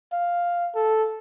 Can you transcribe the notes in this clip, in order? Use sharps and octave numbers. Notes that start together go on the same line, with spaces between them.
F5
A4